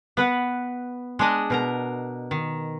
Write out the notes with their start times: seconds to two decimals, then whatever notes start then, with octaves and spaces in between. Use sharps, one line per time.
0.17 B3 B4 F#5
1.19 G#3 D4 D#5
1.50 B2 A#4 A#5
2.31 D#3